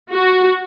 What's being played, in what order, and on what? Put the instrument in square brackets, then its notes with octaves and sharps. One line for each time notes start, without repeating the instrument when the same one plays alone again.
[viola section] F#4